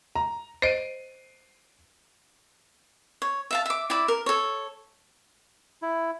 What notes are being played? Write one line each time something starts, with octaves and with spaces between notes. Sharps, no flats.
A#5
C5 D#5 C7 D7 D#7
C#5
E5 F5 A5
E5 D6
E4 D5 E5 D6
A#4
A4 C#5
E4